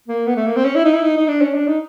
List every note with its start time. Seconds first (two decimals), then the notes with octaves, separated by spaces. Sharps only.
0.08 A#3
0.26 B3
0.36 A3
0.47 A#3
0.56 C4
0.65 C#4
0.75 E4
0.84 D#4
0.94 E4
1.03 D#4
1.16 D#4
1.28 D4
1.42 C#4
1.54 D4
1.67 D#4